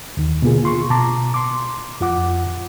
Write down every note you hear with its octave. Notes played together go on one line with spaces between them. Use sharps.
D#2 D#3
B2 D3 A#3 F4 G#4
F4 C6 C#6
B2 A5 A#5 D6
C6 D6
F2 F4 F#5 D6